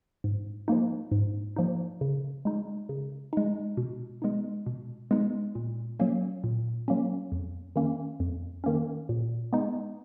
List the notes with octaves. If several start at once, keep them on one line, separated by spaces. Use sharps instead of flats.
G#2
F3 A#3 D#4
G#2
F3 A#3 D#4
C#3
G#3 D#4
C#3
G#3 D#4
B2
G#3 B3 D#4
B2
G#3 B3 D#4
A#2
F#3 A#3 C#4
A#2
F#3 A#3 C#4
F2
D#3 A#3 C#4
F2
D#3 A#3 C#4
A#2
G#3 B3 D#4